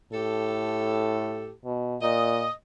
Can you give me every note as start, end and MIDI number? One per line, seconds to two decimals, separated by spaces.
0.12 1.56 45
0.12 1.50 67
0.12 1.50 69
1.65 1.97 47
2.02 2.46 46
2.02 2.51 75